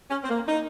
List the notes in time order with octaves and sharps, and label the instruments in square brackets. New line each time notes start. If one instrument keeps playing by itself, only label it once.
[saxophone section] C#4
C4
A#3
D#4